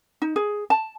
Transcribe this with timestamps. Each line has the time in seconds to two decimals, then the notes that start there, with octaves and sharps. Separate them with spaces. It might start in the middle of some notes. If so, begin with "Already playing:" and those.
0.22 D#4
0.36 G#4
0.70 A5